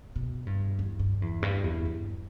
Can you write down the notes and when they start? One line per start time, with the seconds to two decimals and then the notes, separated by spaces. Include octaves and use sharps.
0.16 B2
0.47 G2
0.79 E2
0.99 G2
1.22 E2
1.42 G2
1.64 E2
1.86 G2